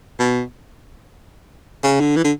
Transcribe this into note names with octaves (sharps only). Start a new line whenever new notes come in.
B2
C#3
D3
E3
D3